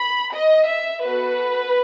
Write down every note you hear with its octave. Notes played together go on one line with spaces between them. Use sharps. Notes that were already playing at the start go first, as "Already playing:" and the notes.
Already playing: B5
D#5
E5
B3 F#4 A4 B4